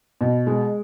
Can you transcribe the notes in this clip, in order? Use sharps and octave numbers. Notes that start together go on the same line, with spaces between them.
B2
G#3